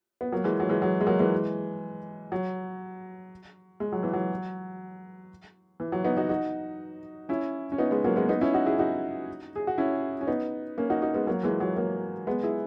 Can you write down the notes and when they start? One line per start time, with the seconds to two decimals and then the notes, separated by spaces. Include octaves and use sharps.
0.21 B3
0.32 F#3 A#3
0.44 E3 G#3
0.60 F#3
0.69 E3 G#3
0.82 F#3
1.01 G#3
1.07 F#3 A#3
1.19 E3 G#3
2.32 F#3
3.80 G#3
3.92 F#3
4.03 E3
4.13 F#3
5.80 E3
5.92 F#3
6.05 B3 D#4
6.17 D#4 F#4
6.29 D#4 F#4
7.29 C#4 E4
7.72 C#4
7.78 B3 D#4
7.91 G#3 B3
8.04 F#3 A#3
8.16 G#3 B3
8.29 B3 D#4
8.41 C#4 E4
8.53 D#4 F#4
8.66 E4 G#4
8.79 D#4 F#4
9.56 G#4
9.67 F#4
9.78 C#4 E4
10.21 C#4
10.27 B3 D#4
10.78 A#3 C#4
10.90 D#4 F#4
11.02 D#4 F#4
11.14 G#3 B3
11.27 F#3 A#3
11.43 E3 G#3
11.60 F#3
11.77 F#3 A#3
12.27 G#3 B3
12.43 E4 G#4